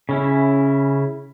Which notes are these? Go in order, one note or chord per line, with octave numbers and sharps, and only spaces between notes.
C#3 C#4 E4